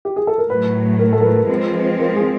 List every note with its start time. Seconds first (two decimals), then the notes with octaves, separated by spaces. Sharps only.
0.05 G4
0.16 G#4
0.27 A4
0.38 A#4
0.50 A2 F#3 A3 B4
0.99 A#4
1.13 A4
1.21 A#4
1.25 B4
1.37 A#4
1.49 F3 G#3 C4 B4
1.74 B4
1.99 A#4
2.16 G#4